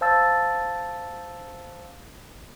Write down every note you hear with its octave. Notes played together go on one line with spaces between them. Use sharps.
C5 F5 A5 E6 A6